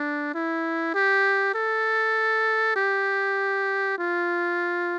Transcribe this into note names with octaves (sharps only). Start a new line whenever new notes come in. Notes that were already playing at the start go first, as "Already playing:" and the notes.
Already playing: D4
E4
G4
A4
G4
F4